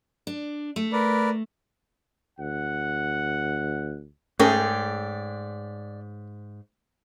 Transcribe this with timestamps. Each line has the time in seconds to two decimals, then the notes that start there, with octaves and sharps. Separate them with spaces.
0.27 D4
0.76 A3
0.92 A#4 B4 D5
2.39 D2 F#5
4.39 G#2 A3 C#4 G#4 A#4 D5 G5